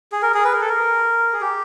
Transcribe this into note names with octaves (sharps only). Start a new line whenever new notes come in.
G#4
A#4
G#4
B4
A#4
A4
A#4
G#4
G4